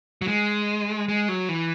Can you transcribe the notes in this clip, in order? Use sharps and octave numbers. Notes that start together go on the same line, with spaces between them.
F#3
G#3
G#3
F#3
E3